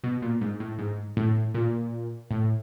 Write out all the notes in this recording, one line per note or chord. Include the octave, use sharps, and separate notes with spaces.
B2
A#2
G#2
A2
G#2
A2
A#2
A2